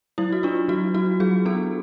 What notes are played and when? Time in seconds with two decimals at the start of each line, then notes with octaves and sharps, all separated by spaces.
0.18 F#3 E4
0.32 F#4
0.43 D4 F4
0.68 F#3 F#4
0.94 F#3 F#4
1.20 F#3 G#4
1.45 B3 A4